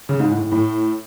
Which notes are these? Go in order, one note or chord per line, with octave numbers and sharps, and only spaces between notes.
C#3
G#2
A2
A2
A2